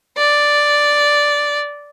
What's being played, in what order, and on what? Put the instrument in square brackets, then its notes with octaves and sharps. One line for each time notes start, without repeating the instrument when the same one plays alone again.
[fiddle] D5